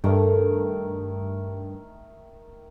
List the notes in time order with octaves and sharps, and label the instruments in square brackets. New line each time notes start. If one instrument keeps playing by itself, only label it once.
[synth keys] G2 [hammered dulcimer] D#3 A3 A#4